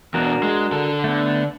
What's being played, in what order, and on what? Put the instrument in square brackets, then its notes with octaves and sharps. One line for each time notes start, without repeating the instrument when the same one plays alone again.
[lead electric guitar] E2 B2 [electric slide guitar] D4 F#4 A#4
[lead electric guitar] G#3
D3 A4
[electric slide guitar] A3 B3